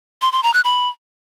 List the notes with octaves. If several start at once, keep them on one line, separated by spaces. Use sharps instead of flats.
C6
C6
A#5
F#6
B5